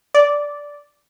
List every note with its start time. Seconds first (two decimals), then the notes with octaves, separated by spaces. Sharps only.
0.14 D5